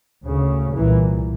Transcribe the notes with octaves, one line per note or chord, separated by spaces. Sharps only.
D2 C#3
C2 A#2 E3